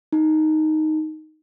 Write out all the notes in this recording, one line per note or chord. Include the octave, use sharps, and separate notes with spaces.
D#4